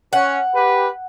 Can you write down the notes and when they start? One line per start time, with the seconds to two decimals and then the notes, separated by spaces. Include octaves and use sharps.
0.13 C#4 F#5
0.54 G4 B4